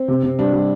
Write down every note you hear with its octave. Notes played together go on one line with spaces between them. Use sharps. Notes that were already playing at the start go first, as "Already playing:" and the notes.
Already playing: C4
C3
C3
G3 D4
G3